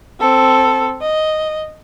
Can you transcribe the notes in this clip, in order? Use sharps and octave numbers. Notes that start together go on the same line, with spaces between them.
C4 A4
D#5